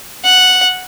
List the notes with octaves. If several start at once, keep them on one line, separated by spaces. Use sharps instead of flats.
F#5